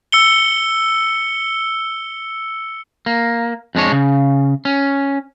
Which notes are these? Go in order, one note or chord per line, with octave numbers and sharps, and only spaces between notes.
E6 C#7 G7
A#3
F2 G#3 D4 C#5
C#3
C#4